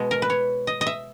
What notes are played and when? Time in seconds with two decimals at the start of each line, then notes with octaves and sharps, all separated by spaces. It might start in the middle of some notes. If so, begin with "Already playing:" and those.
Already playing: B2 G#3
0.11 A#4
0.22 B4
0.30 C#5
0.67 D#5
0.81 D#5
0.87 E5